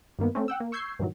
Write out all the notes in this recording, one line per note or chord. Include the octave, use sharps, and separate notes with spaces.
G2 D#3 A#3 B3
A3 C4 C#4
F#5 G5 E6
A#3
C#6 E6 G6 G#6 C7
G2 A#2 D#3 E3 F#3